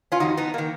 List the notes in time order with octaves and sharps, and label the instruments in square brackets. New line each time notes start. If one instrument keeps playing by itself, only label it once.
[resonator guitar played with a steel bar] C#4 F4
F2 D#3 D#4 F#4
B3 D#4
D#3 A#3